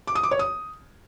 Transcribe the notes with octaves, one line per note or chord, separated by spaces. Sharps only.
D6
D#6
D6
C#5
D#6